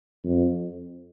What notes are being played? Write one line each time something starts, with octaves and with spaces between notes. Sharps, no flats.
F2